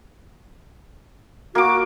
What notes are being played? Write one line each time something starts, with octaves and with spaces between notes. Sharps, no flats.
A#3 F#4 D6